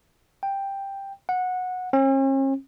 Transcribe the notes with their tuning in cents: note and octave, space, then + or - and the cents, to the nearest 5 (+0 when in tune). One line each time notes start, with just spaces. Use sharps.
G5 +5
F#5 -15
C#4 -45